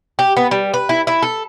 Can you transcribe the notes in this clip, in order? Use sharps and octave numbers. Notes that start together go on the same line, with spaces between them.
G4
B3
G3
B4
E4
E4
A4